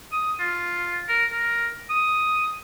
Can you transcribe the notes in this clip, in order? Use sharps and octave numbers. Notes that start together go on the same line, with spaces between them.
D#6
F4
A#4
A#4
D#6